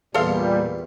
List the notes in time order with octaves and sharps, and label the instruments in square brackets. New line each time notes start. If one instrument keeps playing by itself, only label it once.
[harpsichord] E2 [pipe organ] A#2 G3 [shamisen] A4 C5 F5